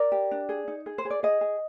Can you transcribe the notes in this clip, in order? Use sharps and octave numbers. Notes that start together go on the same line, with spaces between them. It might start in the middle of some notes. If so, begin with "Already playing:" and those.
Already playing: A#4 D5
G4
D4
G#4
D#4
G#4
C5
G#4
D5
G#4 D#5
G#4